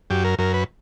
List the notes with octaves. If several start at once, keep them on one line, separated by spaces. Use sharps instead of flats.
F#2 G4
A#4
F#2 A#4
B4